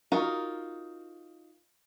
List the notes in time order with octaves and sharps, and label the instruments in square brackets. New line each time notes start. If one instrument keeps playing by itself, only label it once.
[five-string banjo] D#4 F4 F#4 A#4